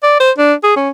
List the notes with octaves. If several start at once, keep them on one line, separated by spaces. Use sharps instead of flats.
D5
C5
D4
G#4
C#4